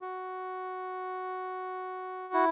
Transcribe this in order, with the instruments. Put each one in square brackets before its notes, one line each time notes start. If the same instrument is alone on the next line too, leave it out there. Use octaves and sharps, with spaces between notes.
[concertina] F#4
E4